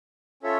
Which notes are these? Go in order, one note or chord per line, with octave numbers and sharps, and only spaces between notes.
C#4 F4 A4 C#5 E5